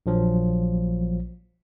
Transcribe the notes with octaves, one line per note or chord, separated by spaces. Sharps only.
A#1 F3 F#3